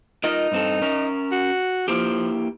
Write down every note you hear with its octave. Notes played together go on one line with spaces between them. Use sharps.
D#4 F4 A#4 D#5
G2 C4 A4
C#4 A#4
F#4
F3 A#3 E4 G4